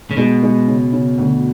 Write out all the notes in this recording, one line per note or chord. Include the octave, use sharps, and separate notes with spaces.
C#3
B2 G#3
G#3
C#3
C#3
D2